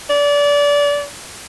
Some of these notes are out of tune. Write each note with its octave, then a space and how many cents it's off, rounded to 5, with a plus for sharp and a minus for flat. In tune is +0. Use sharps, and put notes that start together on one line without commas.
D5 -25